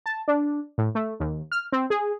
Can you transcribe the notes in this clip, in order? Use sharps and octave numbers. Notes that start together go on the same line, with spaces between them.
A5
D4
A2
A3
D#2
F6
C4
G#4